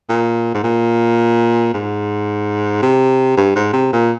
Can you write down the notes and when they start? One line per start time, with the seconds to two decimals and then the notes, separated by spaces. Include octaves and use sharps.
0.09 A#2
0.54 G#2
0.63 A#2
1.74 G#2
2.82 C3
3.37 G2
3.55 G#2
3.73 C3
3.93 A#2